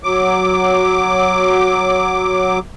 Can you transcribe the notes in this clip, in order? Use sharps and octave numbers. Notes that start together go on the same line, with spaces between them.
F#3 D6